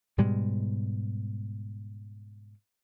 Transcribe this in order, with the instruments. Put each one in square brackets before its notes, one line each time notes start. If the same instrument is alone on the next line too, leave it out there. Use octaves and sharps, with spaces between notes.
[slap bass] G#2 B2 G3 G#3